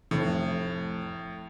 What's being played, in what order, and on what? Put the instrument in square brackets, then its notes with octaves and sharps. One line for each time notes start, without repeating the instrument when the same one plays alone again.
[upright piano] F1 A4 [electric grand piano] A2